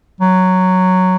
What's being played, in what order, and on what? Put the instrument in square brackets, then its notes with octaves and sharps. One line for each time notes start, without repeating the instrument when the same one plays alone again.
[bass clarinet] F#3